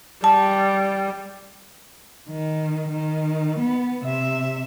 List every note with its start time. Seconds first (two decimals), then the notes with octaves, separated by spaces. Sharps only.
0.24 G3 A5
2.30 D#3
2.89 D#3
3.59 B3
4.05 C3 E5